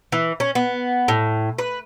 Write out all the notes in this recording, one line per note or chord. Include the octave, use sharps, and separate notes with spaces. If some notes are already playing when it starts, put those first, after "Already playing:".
E3
C#4
B3
A2
B4